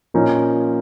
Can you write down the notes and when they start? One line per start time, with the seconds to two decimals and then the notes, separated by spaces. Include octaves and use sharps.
0.14 A#2 F3 A#3 C#4 D#4